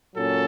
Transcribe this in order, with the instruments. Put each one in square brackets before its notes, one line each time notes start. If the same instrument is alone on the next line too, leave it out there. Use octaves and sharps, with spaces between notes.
[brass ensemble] A#2 F#3 A#3 C#4 A4